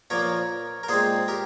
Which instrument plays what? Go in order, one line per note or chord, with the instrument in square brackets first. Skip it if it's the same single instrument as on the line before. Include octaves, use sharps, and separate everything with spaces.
[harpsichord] A#2 F3 A#3 A#4 C#5
A#4
A#2 G#3 C4 G#4 C5
G4 A#4